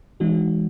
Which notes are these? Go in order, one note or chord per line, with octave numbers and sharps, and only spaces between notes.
E3 G#3 D#4 F#4